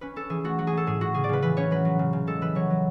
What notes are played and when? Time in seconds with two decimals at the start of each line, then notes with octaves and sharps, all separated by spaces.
0.01 C#4 B4
0.16 C#4 A4
0.29 E3 G#4
0.44 A3 F#4
0.58 F#3 F#4
0.67 G#4
0.72 F#3 A4
0.86 A2 G#4
1.01 A2 F#4
1.14 C#3 G#4
1.24 D5
1.29 C#3 B4
1.42 E3 B4
1.57 C#4 C#5
1.71 F#3 B4
1.85 F#3
1.99 C#3
2.13 C#3
2.27 G#3 A4
2.41 E3 B4
2.55 F#3 C#5
2.70 F#3